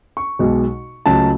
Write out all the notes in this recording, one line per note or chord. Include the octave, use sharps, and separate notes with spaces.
C#6
B1 B2 G#3
C#2 C#3 F#3 A3 A5